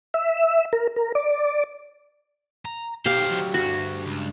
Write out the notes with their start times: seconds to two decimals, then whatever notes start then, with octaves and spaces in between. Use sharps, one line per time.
0.14 E5
0.73 A#4
0.96 A#4
1.15 D5
2.65 A#5
3.06 B1 D#3 G4 C5 F5
3.31 D3 F#3
3.54 D2 G2 F#4
4.06 C#2